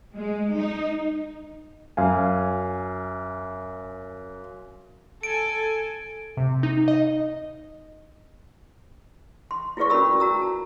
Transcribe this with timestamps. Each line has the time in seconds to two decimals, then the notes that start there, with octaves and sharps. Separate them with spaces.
0.14 G#3
0.55 D#4
1.97 F#2 F5 G#5
5.23 A4 G#5 D7
6.37 C3
6.63 D#4
6.88 D#5
9.51 C6
9.77 E4 F4 G#4 B4 D5 C#6
9.90 C#4 F#4 A#4 B5 E6
10.20 F#4 A#5 E6
10.42 A5